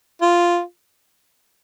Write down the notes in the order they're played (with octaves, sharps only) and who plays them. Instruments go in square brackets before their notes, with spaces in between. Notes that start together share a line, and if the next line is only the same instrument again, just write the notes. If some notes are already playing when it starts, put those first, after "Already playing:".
[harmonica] F4